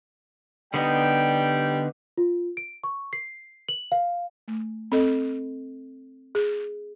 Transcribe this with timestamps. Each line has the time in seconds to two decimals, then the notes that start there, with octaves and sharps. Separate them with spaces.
0.74 D3 G3 B3 D#4 G5
2.18 F4
2.57 D7
2.84 C#6
3.13 C7
3.69 F#7
3.92 F5
4.48 A3
4.92 C4 A4 D#5
6.35 G#4